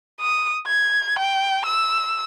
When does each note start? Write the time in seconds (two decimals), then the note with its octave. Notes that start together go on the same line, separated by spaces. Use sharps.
0.20 D#6
0.67 G#6
1.18 G5
1.65 E6